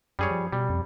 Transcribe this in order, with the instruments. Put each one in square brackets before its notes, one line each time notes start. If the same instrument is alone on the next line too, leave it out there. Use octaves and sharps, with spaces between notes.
[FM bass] F#2 [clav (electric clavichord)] G3 G#4 C#5
[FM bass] F3
[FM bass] B2 [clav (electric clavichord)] G3
[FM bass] F2